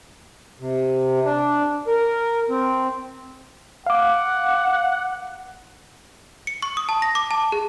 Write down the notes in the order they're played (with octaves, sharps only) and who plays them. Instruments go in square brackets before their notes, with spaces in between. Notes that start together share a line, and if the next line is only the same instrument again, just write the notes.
[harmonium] C3
D4
A#4
C4
[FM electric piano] F5 D6 [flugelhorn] F#5
[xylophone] C#7
C#6
D#6
A5
A#6
D6
A5
G#4